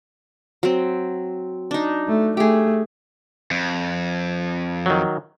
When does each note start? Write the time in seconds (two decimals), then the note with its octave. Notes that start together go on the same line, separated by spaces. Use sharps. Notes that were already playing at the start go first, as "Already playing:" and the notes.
0.63 F#3 C4
1.71 D4 D#4
2.08 A3
2.37 A3 G4 G#4
3.51 F2
4.86 D#3 F#3